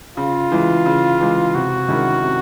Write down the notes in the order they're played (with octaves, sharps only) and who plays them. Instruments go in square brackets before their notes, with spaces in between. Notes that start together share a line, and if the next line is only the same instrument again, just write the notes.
[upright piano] C#3 [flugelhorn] F4
[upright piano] E3 G#3
C#3
E3 G#3
[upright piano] C3 [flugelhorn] F#4
[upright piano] D#3 G#3 C#4 E4
C3